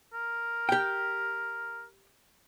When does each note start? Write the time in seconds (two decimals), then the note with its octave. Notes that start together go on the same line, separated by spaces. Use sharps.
0.14 A#4
0.69 G4 G5